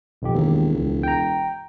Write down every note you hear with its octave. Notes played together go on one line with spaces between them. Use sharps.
B1 F2 G4
E1 D#2
C#2
G5 A#5